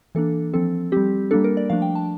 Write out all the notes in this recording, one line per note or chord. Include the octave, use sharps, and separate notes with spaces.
E3 A#3 D4 A4
F3 C4 A4
G3 C4 G4
G3 A#3 D4 A4
A#4
D5
F3 A3 D4 F5
G5
A5